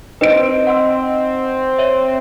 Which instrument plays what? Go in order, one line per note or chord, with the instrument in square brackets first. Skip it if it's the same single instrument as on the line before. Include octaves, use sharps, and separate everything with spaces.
[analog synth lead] C4 [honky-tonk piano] D#4 D7 [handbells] B4
[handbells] F#5 C6 E6
C#5 E5